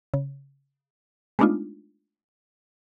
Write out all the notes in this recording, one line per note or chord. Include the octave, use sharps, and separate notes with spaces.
C#3
G#3 A3 B3 D4 D#4 F4